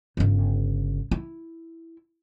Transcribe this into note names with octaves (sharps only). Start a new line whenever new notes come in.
G1 C#3
E4